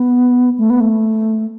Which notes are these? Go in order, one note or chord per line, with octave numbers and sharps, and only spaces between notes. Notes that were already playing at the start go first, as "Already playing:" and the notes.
Already playing: B3
A3
B3
A3